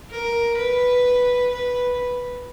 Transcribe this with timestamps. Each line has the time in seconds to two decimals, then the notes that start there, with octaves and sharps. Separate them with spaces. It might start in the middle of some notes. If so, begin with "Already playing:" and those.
0.11 A#4
0.58 B4
1.51 B4